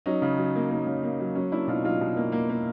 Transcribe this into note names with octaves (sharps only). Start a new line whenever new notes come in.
F#3 C#4 D#4
C#3
F#3
A#3
A#3 C#4 D#4
C#3
A#3
F#3
F#3 C#4
A#3 D4 E4
B2 D#4 F4
F#3 D#4 F4
B2
A#3
A#3
A#3